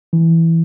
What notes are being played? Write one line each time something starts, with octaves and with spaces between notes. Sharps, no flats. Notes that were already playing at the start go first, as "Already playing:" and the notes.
E3